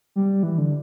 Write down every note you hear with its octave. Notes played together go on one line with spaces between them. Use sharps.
G3
E3
D3